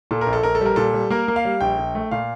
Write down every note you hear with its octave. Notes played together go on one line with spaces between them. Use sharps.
A#2 A4
A#4
A#1
A4
A#1 A#4
A4
G3 A#4
A#2 A4
G3
A#3 A#4
A#3
F5
G3
A#1 G5
A#1
A3
A#2 F5